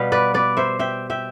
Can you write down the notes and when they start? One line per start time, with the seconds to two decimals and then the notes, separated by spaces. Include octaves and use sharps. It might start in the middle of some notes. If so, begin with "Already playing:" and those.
Already playing: B2 G3 B3 F5
0.12 B4 D5
0.34 B4 D5
0.57 C5 E5
0.79 E5 G5
1.10 E5 G5